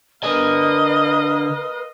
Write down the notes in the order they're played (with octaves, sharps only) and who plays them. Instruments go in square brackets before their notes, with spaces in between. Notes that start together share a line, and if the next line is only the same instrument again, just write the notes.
[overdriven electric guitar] D3 G#5 [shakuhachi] A#4 [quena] B4 [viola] D#5 F5